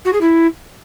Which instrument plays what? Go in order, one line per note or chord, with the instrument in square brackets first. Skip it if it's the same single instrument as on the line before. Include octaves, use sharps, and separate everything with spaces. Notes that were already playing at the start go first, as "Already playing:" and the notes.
[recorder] F#4
G#4
E4